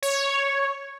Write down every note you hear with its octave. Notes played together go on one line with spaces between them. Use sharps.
C#5